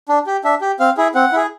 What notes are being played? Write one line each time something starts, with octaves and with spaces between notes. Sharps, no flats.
D4
G4
D4 E5
G4
C4 F5
E4 G#4
C4 F#5
E4 G#4